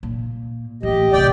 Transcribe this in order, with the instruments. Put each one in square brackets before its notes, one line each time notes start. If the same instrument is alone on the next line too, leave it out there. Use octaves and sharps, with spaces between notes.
[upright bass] A#2
[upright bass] A1 [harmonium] G4 D#5
[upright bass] A1 C3 [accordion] D5 G5